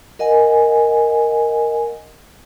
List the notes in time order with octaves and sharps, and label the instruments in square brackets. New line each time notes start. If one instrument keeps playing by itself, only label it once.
[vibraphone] A#4 D#5 F#5 G#5